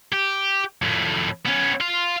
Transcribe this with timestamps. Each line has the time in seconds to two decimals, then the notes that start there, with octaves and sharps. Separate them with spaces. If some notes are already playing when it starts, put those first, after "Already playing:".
0.13 G4
0.82 F2 A2
1.46 B3 C#4
1.81 F5 C6